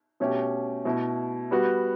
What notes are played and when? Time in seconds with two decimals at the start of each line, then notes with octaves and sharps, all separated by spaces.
0.20 B2 A3 C#4 G4
0.85 B2 A3 E4
1.51 G3 B3 F#4